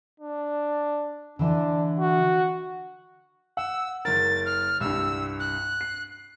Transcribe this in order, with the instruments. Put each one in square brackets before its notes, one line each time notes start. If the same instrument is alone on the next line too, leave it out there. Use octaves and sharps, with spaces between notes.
[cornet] D4
[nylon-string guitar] D3 E3 [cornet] D4
[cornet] F#4
[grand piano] F#5 [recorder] E6
[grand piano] F#1 A#4 [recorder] A6
[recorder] F6
[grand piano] C2 G2 [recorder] E6
[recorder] F#6
[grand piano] C7